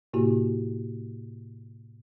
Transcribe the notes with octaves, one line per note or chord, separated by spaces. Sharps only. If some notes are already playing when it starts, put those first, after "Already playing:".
A2 C3 A#3 E4 F#4 G4